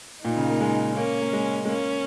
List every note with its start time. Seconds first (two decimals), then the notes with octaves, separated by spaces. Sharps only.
0.24 A#2 D#4
0.37 C#3
0.49 A#3
0.61 G#3
0.97 A#3 C#4
1.22 A#3
1.33 G#3
1.65 G#3
1.69 A#3 C#4